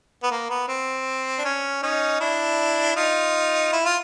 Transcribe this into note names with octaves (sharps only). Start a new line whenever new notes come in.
B3
A#3
B3
C4
D4
C#4
C#4 D#4
D4 E4
D#4 F4
E4
F4